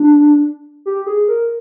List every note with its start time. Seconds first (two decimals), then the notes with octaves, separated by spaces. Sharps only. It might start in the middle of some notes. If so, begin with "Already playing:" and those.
Already playing: D4
0.86 G4
1.06 G#4
1.28 A#4